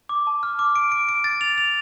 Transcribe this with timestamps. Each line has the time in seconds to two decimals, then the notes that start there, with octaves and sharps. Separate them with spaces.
0.09 D6
0.27 A5
0.43 F6
0.59 D6
0.76 D7
0.92 D7
1.09 D7
1.24 A6
1.41 F7
1.58 F7